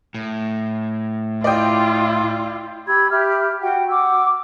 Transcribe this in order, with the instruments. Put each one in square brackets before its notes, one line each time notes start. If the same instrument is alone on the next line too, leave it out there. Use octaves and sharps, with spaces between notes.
[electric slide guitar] A2
[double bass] E4 [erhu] F4 [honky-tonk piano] D5 D#5 G5
[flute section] G4 B5 E6 G#6
G4 E5 B5 F6
F#4 F#5 G5
F#5 D6 E6